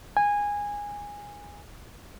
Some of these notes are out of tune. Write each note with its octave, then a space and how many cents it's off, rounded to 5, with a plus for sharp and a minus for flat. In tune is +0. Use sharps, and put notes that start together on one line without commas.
G#5 -15